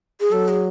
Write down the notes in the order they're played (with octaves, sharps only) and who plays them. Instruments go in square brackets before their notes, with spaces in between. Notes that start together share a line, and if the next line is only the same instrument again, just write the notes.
[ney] G#4
[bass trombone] F#3 [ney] A4
[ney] G#4